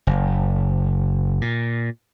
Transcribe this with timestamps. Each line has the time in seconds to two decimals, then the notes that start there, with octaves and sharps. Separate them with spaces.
0.07 F#1
1.41 A#2